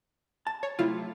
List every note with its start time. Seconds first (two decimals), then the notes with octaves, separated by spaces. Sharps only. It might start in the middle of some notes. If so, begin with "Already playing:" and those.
0.47 A5
0.63 C#5
0.79 C3 F#3 A3 E4 F4